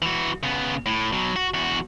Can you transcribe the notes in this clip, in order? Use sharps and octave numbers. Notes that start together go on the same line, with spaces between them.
E3 F#4
C#3 B3
A2
B2 F#3
F#4
E2 F#4